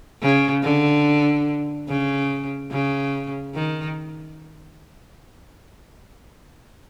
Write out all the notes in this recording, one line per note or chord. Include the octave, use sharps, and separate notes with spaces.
C#3
D3
C#3
C#3
D#3